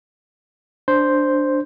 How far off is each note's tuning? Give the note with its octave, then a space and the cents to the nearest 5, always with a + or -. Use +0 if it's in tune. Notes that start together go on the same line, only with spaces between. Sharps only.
D4 +0 C5 +0